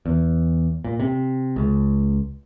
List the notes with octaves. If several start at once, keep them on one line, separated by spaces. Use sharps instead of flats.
E2
A#2
C3
C#2